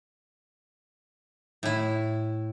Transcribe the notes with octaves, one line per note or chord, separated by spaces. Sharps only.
A2 E4